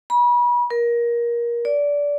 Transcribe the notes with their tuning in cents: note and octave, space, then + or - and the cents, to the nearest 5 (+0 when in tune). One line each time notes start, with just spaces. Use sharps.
B5 -35
A#4 +20
D5 -20